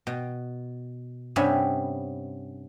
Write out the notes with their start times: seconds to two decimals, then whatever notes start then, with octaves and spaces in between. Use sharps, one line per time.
0.07 B2
1.36 G2 C3 B3 C#4 E5